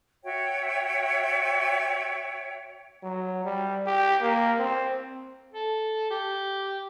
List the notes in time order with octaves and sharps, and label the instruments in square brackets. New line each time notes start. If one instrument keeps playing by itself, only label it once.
[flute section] F#4 C#5 E5 G5
[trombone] F#3
G3
G4
A#3
C4
[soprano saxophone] A4
G4